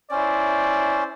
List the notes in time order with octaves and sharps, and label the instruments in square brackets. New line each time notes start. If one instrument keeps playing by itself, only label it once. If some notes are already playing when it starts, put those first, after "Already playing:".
[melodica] C#4 [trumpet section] E4 C5 D5